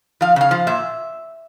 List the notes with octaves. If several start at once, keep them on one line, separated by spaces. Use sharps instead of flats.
F3 F5
C#3 F5
F3
A#2 E5